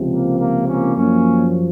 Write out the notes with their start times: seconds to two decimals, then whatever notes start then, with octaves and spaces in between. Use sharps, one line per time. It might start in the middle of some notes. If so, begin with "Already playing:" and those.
Already playing: C#2 C3 F3
0.10 A#3
0.39 A#3
0.68 A#3 C#4
0.96 F#2 F3 A#3 C#4